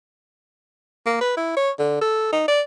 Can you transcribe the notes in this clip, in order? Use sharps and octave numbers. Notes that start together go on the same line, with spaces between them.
A#3
B4
E4
C#5
D3
A4
D#4
D5